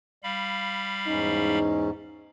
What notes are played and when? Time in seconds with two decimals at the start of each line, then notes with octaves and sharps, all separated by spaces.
0.23 G3 F5 B5
1.07 E2 G#2 C#4 D#4